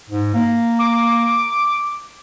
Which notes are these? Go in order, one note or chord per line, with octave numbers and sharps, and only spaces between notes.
G#2
A#3
D6